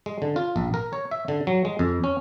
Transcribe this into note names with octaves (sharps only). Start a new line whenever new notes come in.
G#3
D3
F4
A#1
A#4
C#5
E5
D3
F#3
G#3
F2
C#4